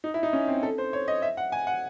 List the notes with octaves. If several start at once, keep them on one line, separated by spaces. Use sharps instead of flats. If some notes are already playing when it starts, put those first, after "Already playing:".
D#4
E4
D#4
C#4
C4
A4
C5
C#5
D#5
E5
F#5
G#5
F#5